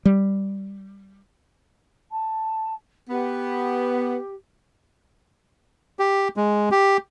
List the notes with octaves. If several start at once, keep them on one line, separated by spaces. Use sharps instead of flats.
G3
A5
B3 G4
G4
G#3
G4